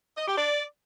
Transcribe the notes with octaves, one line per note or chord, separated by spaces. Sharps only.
D#5
G4
D5